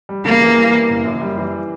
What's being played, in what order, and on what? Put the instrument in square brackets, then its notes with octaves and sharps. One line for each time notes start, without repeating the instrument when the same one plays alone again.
[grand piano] G3
[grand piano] C#3 [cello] A#3
[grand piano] E3
G3
E3
F#1
F#2
G3
E3